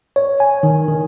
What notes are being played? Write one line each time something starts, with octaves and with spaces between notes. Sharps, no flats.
C#5
G#5
D#3
D#3